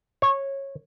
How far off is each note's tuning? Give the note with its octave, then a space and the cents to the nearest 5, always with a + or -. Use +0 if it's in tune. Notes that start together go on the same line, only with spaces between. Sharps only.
C#5 -15